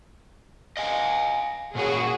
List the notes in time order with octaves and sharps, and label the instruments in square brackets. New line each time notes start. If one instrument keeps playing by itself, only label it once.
[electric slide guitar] D#5 F5 G#5
[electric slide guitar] A#2 C#4 C#5 [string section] F#4 G#4